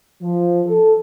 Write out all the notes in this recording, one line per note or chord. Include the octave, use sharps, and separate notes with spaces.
F3
A4